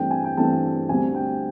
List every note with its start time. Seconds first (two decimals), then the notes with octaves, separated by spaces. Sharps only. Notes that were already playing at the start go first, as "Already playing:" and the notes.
Already playing: G2 E3 A3 C4 G5
0.11 G#5
0.24 G5
0.37 G2 E3 A3 C4 A5
0.89 D2 D3 G3 C4 G#5
1.14 G5